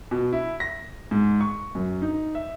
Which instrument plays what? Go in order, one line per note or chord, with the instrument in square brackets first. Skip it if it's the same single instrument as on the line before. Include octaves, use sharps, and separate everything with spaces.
[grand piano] B2
E4
A#6
G#2
C#6
F#2
D#4
E5